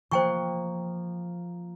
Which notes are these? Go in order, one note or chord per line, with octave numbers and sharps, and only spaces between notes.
F3 A#3 C5 G5 C#6